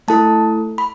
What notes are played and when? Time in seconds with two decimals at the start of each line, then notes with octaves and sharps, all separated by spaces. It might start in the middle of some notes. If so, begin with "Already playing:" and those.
0.08 A3 E4 A4 A5
0.78 B5